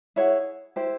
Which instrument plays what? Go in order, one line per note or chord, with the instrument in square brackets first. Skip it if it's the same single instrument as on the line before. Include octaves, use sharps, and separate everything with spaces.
[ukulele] E4 G#4 C#5 F#5
E4 G4 C5